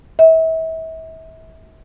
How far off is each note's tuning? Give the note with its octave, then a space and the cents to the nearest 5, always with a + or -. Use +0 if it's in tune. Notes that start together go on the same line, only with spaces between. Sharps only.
E5 -35